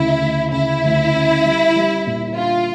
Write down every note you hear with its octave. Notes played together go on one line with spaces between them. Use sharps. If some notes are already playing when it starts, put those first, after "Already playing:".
Already playing: D2 C#3 E4
D2
C#3 E4
D2
C#4
G3
G3
A#2
D4 F4